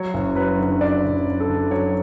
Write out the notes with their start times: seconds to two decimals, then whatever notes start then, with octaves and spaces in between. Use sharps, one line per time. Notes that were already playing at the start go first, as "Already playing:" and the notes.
Already playing: F#3 C#5
0.14 F#1
0.36 F#3 B4
0.59 D3
0.81 F#3 D5
1.04 F#1
1.27 F#3
1.40 A4
1.48 D3
1.70 F#3 C#5